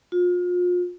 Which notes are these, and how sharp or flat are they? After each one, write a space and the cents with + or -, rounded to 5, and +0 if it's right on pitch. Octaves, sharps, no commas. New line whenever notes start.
F4 +35